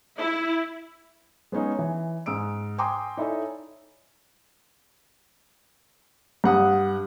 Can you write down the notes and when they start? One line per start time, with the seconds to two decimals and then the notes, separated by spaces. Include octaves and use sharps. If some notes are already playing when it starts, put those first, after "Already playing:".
0.18 E4
1.52 G#3 B3 C#4 D#4 G#4
1.79 E3 G#5
2.26 G#2 D#6 E6 D7
2.78 G5 G#5 A#5 C6 D6 D#6
3.17 D#4 E4 A4 C#5 D5 G#5
6.44 G2 F#5 D#6